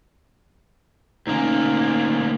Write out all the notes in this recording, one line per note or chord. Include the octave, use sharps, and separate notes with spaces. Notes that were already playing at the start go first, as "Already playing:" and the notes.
D2 A#3 C#4 D#4